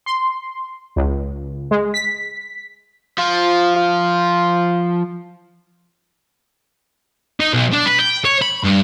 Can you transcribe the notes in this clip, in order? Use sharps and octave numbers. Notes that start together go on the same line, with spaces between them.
C6
C#2
G#3
B6
F3 F4
F4
D#4
B1
D4
B4
G5
C#5
B5
G2